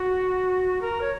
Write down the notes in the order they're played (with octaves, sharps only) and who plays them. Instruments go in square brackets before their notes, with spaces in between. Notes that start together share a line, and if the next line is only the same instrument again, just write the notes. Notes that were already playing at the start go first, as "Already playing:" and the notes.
Already playing: [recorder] F#4
A#4
C#5